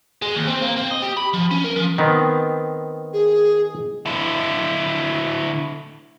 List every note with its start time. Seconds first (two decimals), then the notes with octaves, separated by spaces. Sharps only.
0.22 G#3
0.35 D#2
0.48 C4
0.62 A#3
0.77 C4
0.91 D#5
1.03 G4
1.17 B5
1.34 F3
1.51 C#4
1.64 A#4
1.76 F3
1.98 D#3 B3 C4
3.13 G#4
4.06 D3 E4